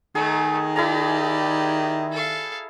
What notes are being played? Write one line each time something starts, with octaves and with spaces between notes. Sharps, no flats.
D#3 A3 D#4 G#4
E4 G4 G#4 D5 A#5
A4 F5